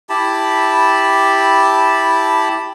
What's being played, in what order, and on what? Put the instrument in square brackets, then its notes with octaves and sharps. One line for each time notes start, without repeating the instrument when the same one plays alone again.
[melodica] E4 G4 A5 B5